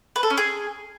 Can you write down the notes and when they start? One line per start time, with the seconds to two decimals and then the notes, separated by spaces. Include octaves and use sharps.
0.16 B4
0.23 A4
0.30 C#4
0.38 G#4